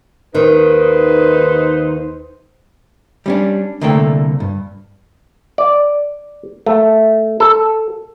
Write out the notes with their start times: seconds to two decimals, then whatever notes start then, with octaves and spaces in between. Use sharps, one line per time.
0.35 D#2 D#3 D#4 B4 C5
3.26 G3 C#4 D4
3.81 C2 D3 A3 A#3 A4 G5
4.40 G2
5.58 D5
6.66 A3
7.40 A4